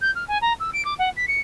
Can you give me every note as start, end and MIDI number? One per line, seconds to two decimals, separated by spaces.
0.01 0.11 91
0.15 0.27 89
0.28 0.38 80
0.41 0.53 82
0.60 0.70 88
0.73 0.84 98
0.85 0.94 86
0.99 1.09 78
1.16 1.25 95
1.28 1.41 97